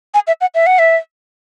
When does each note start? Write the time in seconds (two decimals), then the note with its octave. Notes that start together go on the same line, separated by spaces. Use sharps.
0.14 G#5
0.27 E5
0.41 F#5
0.55 E5
0.66 F#5
0.79 E5